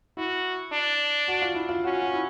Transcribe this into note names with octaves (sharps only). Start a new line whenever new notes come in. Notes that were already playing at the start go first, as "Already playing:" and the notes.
E4 F#4
D4
F#4
F4
E4
F4
C#4 F#4
F#4
E4